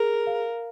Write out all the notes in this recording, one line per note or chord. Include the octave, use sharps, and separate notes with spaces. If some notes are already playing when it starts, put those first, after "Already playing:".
Already playing: G#4 A#4
F5